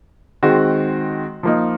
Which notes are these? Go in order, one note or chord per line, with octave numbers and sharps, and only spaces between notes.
D#3 G#3 C4 F#4
F3 A#3 D#4